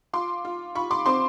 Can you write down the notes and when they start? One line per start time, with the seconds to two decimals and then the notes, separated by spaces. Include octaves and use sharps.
0.13 F4 C6 D6
0.45 F4
0.75 F4 B5 C#6
0.91 C6 D6
1.06 C4 C6 D6